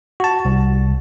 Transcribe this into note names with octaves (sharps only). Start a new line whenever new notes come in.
F#4 A5
C2